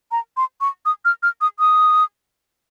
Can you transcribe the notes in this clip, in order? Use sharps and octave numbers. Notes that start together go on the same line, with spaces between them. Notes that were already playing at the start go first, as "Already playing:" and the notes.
A#5
C6
C#6
D#6
F6
F6
D#6
D#6